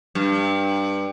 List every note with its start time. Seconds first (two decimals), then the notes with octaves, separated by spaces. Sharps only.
0.15 G2